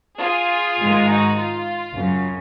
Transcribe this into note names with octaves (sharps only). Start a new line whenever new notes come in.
F4 G#4
G#2 D#3 G#3
D#4 F#4
F4
F#2 C#3 F#3